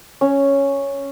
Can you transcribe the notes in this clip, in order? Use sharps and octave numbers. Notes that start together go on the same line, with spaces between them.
C#4